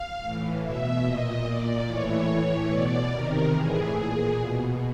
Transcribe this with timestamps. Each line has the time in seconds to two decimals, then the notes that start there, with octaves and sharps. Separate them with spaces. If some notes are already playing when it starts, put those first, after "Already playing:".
Already playing: F5
0.21 A2 E3
0.63 B2 E5
1.04 A#2 D#5
1.45 A#2 D5
1.87 A2 E3 C#5
2.28 A2 E3
2.70 B2 D5
3.11 C3 D#3 A#4
3.52 A2 E3 G#4
3.94 A#2
4.36 B2